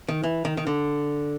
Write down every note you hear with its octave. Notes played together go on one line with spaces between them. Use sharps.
D#3
E3
D#3
D#3
D3